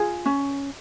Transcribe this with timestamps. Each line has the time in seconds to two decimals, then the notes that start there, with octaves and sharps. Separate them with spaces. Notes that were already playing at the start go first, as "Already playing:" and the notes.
Already playing: F4 G#4
0.26 C#4